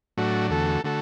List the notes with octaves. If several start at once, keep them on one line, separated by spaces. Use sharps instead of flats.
A2 F#3 A3 D4 F#4
E2 D3 A3 F#4 A4
D3 A3 F#4 A4